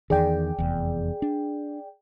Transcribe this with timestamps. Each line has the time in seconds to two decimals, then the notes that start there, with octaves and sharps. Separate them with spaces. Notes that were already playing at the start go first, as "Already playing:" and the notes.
0.10 E2 D#3 G#4 D5 G5
0.58 F1 E2
1.22 D4